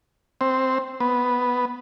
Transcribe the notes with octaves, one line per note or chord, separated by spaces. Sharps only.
C4
B3